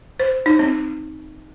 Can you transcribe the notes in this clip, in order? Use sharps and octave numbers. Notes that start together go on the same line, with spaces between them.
C5
D#4
C4